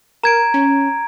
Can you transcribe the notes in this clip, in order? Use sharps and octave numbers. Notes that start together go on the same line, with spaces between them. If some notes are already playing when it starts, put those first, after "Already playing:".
A#4 A#5 G#6 D7
C#4